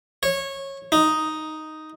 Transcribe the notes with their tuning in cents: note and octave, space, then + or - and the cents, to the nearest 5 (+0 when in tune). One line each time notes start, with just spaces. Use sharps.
C#5 -20
D#4 +0